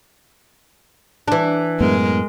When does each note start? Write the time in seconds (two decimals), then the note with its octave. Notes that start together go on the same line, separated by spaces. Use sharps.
1.28 E3 D4
1.80 F#2 A2 G#3 B3 A#4